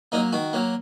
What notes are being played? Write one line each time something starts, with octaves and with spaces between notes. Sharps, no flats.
F#3 A#3 D#4
D#3 F#4
F#3 A#3